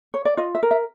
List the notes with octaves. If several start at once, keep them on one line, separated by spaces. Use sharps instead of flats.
C#5
D5
F4 D#5
E5
A#4
E5